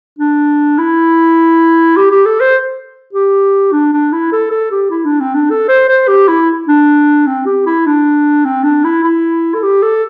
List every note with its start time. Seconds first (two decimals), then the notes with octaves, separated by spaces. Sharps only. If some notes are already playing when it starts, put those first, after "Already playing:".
0.19 D4
0.78 E4
1.96 G4
2.11 G4
2.26 A4
2.40 C5
3.13 G4
3.72 D4
3.93 D4
4.12 E4
4.32 A4
4.51 A4
4.71 G4
4.90 E4
5.05 D4
5.20 C4
5.35 D4
5.50 A4
5.68 C5
5.89 C5
6.08 G4
6.28 E4
6.68 D4
7.27 C4
7.46 G4
7.66 E4
7.86 D4
8.45 C4
8.63 D4
8.84 E4
9.04 E4
9.54 A4
9.63 G4
9.82 A4